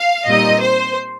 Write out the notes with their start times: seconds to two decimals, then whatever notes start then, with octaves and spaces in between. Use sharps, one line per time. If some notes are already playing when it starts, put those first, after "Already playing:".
Already playing: F5
0.27 A#2 G3 C4 D#4 D#5
0.61 C5